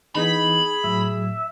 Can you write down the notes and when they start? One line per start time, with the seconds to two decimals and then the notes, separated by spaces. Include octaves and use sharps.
0.15 E3 B3 D#4 G#4 B5
0.84 A2 F#3 E5